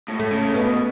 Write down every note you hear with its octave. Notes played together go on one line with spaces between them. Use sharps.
A2
A3
C#3
B2 B3